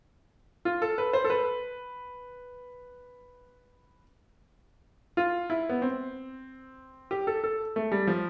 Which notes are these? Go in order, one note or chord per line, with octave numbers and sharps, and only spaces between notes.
F4
A4
B4
C5
A4
B4
F4
E4
B3
C4
G4
A4
A4
A3
G3
F3